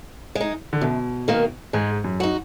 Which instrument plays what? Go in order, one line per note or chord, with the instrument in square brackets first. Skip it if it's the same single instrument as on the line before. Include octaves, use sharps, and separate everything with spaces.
[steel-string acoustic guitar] G#3
D#4
[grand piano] D3
[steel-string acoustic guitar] F#2 [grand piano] B2
[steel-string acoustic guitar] D#3 A#3
[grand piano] G#2 [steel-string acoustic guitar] G#3
[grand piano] F#2
[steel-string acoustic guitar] D#4 F#4